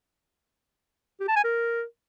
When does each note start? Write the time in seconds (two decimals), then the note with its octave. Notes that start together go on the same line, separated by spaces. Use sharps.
1.20 G4
1.28 A5
1.36 G#5
1.44 A#4